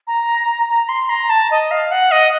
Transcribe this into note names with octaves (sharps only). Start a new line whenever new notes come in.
A#5
A#5
C6
A#5
A5
D#5
F5
F#5
D#5